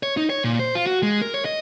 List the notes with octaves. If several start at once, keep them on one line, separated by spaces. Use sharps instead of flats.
C#5
D#4
C#5
A#2
C5
F4
F#4
G#3
A#4
C#5
D#5